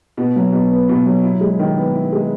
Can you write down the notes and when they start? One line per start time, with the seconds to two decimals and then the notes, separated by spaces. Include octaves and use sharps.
0.17 B2
0.36 F#3
0.53 B2
0.71 B3
0.89 B2
1.06 F#3
1.24 E4
1.41 G#3
1.59 D#3
1.77 B3
1.94 E4
2.12 G#3